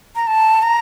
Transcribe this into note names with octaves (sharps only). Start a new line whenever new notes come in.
A#5
A5
A#5